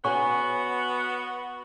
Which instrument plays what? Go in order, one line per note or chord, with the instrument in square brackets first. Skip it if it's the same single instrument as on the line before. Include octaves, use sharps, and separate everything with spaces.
[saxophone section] B3 F#4 [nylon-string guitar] C#5 G#5 [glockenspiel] C#6